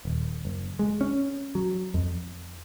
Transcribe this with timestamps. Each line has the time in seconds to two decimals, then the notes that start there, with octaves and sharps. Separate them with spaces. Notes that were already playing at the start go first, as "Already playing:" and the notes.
0.05 D#1
0.45 F#1
0.79 G#3
1.01 C#4
1.55 F#3
1.94 F2